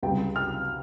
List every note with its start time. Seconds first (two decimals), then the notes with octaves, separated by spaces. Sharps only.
0.03 C#2 C3 G3 G5
0.36 F6